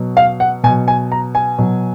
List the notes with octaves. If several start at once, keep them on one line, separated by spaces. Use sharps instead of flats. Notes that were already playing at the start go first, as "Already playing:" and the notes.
Already playing: B2 F#3
F5
F#5
B2 F#3 G#5
G#5
A#5
G#5
B2 F#3